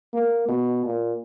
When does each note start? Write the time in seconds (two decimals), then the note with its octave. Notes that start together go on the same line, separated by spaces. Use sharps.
0.14 A#3
0.49 B2
0.86 A#2